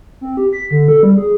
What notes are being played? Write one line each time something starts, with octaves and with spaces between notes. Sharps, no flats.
C4
G4
B6
D3
A4
G3
G#4